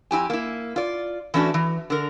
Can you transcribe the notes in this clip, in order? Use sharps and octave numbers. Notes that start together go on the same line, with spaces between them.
F2 E4 G4 G#5
A#3 E4
F4 D5
E3 A3 C#4 D4 F#4
E3
D3 A#4